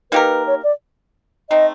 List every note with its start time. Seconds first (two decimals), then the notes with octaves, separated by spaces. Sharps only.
0.12 A#3 D#4 G4 A#4 B4
0.47 C#5
0.64 D5
1.50 A3 C4 D#4 D#5